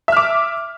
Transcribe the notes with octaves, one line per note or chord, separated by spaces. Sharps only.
E5 D6 F6